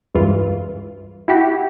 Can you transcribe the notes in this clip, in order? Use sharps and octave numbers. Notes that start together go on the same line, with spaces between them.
C#2 G2 E3 F4
E4 F#4 G4